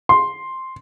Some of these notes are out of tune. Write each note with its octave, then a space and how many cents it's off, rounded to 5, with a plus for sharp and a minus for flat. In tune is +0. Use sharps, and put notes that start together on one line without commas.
C6 +5